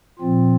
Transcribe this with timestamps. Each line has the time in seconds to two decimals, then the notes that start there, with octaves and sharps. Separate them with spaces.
0.19 A#2 F3 C4 F4